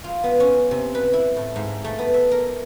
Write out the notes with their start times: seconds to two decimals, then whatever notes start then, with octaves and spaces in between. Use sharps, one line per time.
0.04 F4
0.24 B3
0.40 C#4
0.71 C3
0.95 B4
1.13 E4
1.37 A2
1.56 G#2
1.84 A3
1.99 B3
2.14 E5
2.31 A#4